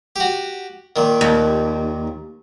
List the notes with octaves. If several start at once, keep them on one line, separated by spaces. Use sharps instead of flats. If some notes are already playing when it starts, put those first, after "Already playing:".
F#4 G4
A#2 D#3
D#2